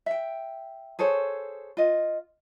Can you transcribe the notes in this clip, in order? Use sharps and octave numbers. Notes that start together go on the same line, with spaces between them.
E5 G5
G#4 A4 C5 C#5
F4 D#5